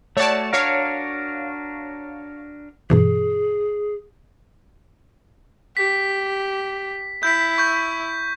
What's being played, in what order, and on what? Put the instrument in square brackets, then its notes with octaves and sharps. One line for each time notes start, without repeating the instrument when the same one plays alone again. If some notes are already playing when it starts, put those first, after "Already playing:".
[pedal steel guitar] A3 F#4 [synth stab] C#5 D5 A5
[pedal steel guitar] D4 F#4 A#4 [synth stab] C#5 F5
[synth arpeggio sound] G2 B2 E3 [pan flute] G#4
[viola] G4 [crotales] B6
[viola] E4 [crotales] G6 B6
[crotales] C#6 G6